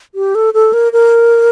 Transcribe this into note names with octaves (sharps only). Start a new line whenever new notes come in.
G4
A4
A4
A#4
A#4